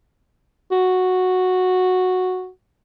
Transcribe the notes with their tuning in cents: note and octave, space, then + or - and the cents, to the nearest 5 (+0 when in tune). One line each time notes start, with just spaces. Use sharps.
F#4 -5